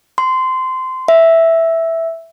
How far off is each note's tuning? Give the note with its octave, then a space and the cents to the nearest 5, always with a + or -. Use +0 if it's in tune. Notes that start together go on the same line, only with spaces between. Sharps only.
C6 -20
E5 +0